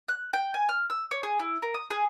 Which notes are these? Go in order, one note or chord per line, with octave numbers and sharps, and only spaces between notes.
F#6
G5
G#5
F6
E6
C#5
G#4
E4
A#4
D#6
G#4